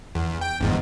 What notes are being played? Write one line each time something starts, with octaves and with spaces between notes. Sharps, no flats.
E2
G5
G1 E2 G#2